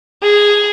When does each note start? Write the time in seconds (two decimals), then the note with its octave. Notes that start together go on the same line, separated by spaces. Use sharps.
0.23 G#4